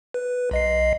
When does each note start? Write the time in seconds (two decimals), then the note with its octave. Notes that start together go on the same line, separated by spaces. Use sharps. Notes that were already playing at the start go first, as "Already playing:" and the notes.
0.14 B4
0.51 B1 D#5 C7